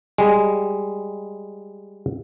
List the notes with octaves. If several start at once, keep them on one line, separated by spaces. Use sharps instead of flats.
G3 G#3